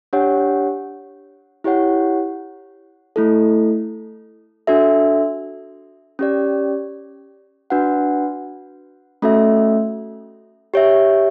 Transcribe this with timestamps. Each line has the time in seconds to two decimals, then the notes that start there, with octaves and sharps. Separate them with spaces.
0.13 D4 G4 C#5 F#5
1.64 E4 G4 C#5 F#5
3.16 A3 E4 A4
4.67 D4 F#4 A4 E5
6.19 C#4 G4 D5
7.70 D4 F#4 B4 F#5
9.22 A3 C#4 F#4 A4 E5
10.74 G4 C#5 E5